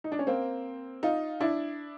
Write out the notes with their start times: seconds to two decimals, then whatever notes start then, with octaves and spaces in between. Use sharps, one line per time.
0.04 D#4
0.12 D4
0.19 C#4
0.27 A#3 C4
1.03 D#4 F4
1.40 D4 E4